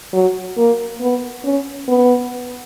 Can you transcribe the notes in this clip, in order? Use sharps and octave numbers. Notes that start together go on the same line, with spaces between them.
F#3
A#3
B3
C#4
B3